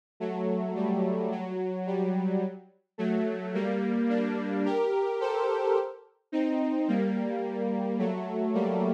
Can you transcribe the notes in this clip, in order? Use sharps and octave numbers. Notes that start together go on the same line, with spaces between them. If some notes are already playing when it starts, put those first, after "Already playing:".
F#3 A3
G3
F#3
G3
F#3 A3
G3 A#3
A#3 D4
G4 A#4
A4 C5
C4 D#4
G3 A#3
F#3 A3
G3 A#3